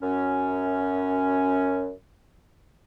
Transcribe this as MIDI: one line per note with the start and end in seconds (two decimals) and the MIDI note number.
0.02 1.90 42
0.02 1.90 61